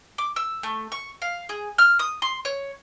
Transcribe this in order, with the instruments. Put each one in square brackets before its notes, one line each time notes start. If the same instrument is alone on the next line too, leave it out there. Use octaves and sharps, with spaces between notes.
[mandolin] D6
E6
A3
C#6
F5
G#4
F6
D#6
C6
C#5